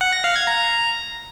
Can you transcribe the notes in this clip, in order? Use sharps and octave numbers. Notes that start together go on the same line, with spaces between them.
F#5
A#6
F5
G#6
A#5